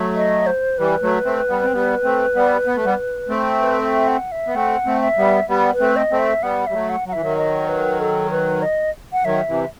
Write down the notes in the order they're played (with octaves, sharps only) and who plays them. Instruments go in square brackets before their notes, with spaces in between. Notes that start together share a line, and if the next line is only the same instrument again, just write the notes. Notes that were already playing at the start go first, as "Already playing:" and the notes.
Already playing: [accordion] F#3 A3
[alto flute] D#5
C5
[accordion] E3 G3 [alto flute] B4
[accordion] F#3 A3
A3 C4
G3 B3
C4
G3 B3
A3 C4
G3 B3
B3
A3
G3 B3
A3 C4
[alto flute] B4
E5
F#5
E5
[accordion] B3
[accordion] A3 C4 [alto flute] F#5
[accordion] A3 C4
[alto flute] E5
[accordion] G3 B3
G3 B3
[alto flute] B4
[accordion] A3 C4
[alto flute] D#5
[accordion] A3 C4
[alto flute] E5
[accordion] G3 B3 [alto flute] F#5
[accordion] G3 [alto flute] E5
[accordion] F#3 A3
[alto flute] F#5
[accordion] F#3
[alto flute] F#5
[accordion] E3 [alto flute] E5
[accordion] D#3 F#3
[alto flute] D#5
B4
A4
B4
D#5
F#5
[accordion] D#3 F#3 [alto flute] E5
[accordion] C3 E3